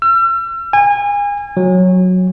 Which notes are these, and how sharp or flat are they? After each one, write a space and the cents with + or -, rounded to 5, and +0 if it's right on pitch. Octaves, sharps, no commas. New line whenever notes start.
E6 +45
G#5 -30
F#3 -10